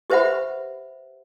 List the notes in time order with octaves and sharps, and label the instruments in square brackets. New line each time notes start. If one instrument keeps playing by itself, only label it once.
[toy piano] G4 B4 C5 E5 F#5 B5